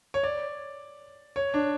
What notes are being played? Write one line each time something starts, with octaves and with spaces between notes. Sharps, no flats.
C#5
D5
C#5
D4